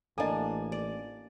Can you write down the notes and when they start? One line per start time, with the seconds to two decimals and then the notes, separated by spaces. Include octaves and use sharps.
0.18 A1 A#3 D4 A4 D#5 G#5
0.72 D5